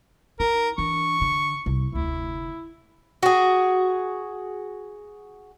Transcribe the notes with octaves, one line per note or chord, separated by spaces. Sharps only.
D#4 A#4
E3 D4 C#6
D3
C2
F1 D2 E4
F#4 G#4